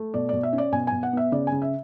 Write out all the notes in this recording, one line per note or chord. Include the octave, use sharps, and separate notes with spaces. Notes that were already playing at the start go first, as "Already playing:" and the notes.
Already playing: A3
B2 D5
B2 D5
E5
C#4
D5
B2 G#5
G#5
B2
F#5
B3 E5
C#3 D5
G#5
C#3
E5